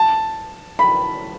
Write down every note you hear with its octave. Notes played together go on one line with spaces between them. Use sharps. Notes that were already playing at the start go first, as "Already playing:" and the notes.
Already playing: A5
B5